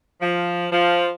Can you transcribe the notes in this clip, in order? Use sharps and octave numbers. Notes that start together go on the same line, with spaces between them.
F3
F3